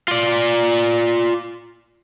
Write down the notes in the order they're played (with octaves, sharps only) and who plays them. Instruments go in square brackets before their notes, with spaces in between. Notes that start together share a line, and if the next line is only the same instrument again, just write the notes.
[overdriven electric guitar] F4 D5